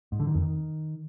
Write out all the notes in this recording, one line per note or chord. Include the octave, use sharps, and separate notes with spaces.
G#2
D3
D#3
F2
D#3